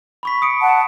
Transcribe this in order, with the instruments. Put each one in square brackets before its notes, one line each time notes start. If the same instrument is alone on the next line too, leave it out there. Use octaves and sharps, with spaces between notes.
[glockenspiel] B5 C#6 B6
D#6 C#7 D7
[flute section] F#5 A5